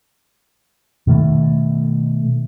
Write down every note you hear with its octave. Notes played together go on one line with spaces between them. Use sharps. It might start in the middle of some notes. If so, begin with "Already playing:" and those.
B2 D#3 A3